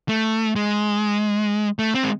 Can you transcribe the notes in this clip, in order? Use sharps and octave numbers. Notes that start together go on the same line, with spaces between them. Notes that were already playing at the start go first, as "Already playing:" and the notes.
A3
G#3
A3
C4
G#3